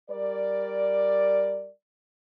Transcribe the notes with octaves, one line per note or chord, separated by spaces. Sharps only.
G3 A#4 D5